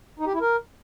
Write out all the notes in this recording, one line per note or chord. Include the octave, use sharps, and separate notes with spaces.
D#4
G4
E4
A#4